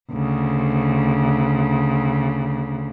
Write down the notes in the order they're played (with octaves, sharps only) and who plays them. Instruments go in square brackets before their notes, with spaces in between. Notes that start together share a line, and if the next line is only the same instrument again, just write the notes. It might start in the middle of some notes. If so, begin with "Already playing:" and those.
[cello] D2 C#3